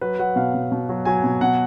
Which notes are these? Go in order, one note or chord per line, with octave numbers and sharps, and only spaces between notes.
F#3 B4
F#3 F#5
B2 F5
B2
B2
F#3
F#3 G#5
B2
B2 F#5